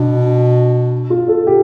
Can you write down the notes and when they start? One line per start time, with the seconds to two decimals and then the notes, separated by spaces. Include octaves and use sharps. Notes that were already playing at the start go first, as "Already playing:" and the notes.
Already playing: B2 D4
1.10 F4
1.28 A4
1.47 G4